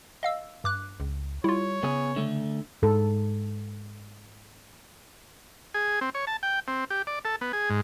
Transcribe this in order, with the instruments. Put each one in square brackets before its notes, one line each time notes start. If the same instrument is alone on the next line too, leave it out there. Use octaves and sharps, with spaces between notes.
[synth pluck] D#5 F5 E6
G2 D6 F#6
[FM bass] C#2
[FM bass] G3 [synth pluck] E4 F4 [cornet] C#5
[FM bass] C#3 [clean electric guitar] B3 G#4
[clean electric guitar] D3 A3
[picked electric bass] G#2 [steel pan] A4
[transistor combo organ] G#4
C4
C#5
A5
G5
C4
G4
D5
A4
B3
G#4
G#2